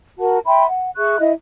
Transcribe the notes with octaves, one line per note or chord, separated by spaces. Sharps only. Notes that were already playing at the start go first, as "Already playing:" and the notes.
F#4 A#4 F#5 A5
E5 G5 B5 C6
F#5
G#4 E5 C#6 F#6
E4 D#5 E5